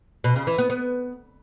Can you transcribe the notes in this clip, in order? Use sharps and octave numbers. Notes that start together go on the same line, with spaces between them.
B2
C#3
E3
B3
B3